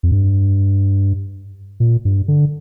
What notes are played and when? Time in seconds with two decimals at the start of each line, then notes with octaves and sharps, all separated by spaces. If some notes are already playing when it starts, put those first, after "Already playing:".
0.03 F2
0.12 G2
1.80 A#2
2.05 G2
2.28 D3